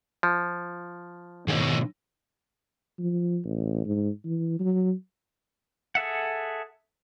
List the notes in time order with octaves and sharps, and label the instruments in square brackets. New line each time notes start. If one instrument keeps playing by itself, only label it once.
[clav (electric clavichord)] F3
[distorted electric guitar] G#2 B2 [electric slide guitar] D#3 C#5 D#5
[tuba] F3
A1
G#2
E3
F#3
[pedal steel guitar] G#4 A4 E5 F#5